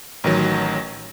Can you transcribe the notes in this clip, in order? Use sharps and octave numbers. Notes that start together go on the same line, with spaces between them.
A1 D#3 F#3